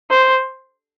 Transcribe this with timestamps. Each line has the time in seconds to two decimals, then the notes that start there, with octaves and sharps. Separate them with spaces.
0.10 C5